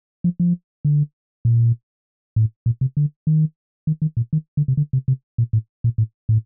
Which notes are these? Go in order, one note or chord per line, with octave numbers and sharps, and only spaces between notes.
F3
F3
D3
A#2
A2
A#2
C3
D3
D#3
D#3
D#3
A#2
D#3
D3
C3
D3
C3
C3
A#2
A2
A#2
A2
A2